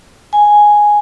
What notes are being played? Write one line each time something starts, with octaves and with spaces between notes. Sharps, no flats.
G#5